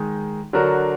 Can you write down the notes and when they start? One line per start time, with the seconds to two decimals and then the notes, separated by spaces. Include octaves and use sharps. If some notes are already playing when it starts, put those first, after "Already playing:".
Already playing: D#3 G#3 D#4
0.53 D3 F#3 D4 F#4 A#4